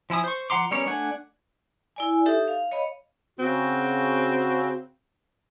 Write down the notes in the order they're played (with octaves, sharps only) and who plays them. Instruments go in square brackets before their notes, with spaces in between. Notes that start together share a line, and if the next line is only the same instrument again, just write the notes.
[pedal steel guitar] F3 E4 G#5 D#6
C5 C#6
F3 F#5 A#5 C6 D6
G3 B3 C#4 A#4 C#5
A3 D4 F#5 G#5
[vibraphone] E4 D5 G#5
D#4 G4 A4 E5
F5
C#5 D#5 F5 B5
[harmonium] C#3 F#4 [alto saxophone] C4